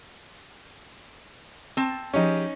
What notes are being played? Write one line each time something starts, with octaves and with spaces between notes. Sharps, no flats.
C4 A5
F3 C#4 D#4 G4 G#4